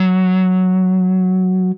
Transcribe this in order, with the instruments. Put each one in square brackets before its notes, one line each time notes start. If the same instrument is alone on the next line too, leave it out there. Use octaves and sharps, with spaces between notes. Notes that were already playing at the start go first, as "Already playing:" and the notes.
Already playing: [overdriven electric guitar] F#3